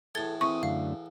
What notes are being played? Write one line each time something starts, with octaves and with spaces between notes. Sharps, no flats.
E2 A2 A4 G#6 A6 G7
E2 A2 C4 C#6 D#6
F#2 D3 A3 F5